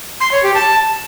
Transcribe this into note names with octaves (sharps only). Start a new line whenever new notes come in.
C6
C#5
G4
A5